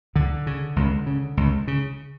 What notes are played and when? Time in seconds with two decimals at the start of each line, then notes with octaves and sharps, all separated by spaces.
0.15 C#2 D3
0.47 C#3
0.76 C#2
1.06 C#3
1.37 C#2
1.67 C#3